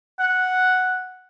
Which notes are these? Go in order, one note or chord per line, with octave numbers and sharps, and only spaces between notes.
F#5